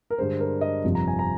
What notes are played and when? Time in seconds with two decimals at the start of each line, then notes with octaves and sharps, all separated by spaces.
0.10 A#4
0.18 G2 D3 G#3 C5
0.40 A#4
0.61 D#5
0.84 G1 F2 C3 F3
0.95 A#5
1.08 G#5
1.19 A#5